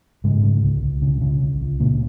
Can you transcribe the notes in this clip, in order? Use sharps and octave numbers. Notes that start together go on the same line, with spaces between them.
G#2 C#3 G#3
C#3
C#2
C#2
C#3
C#3
C#2
C#2
A#2 C#3 A#3